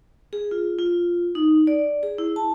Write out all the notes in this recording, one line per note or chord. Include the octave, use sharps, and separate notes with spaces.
G#4
F4
F4
D#4
D5
G#4
E4
A5